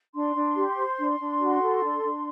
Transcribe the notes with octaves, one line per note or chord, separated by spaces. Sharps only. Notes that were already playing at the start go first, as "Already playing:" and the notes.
D4 C6
D4
G4
C5
D4
D4
F#4
A4
D4
D4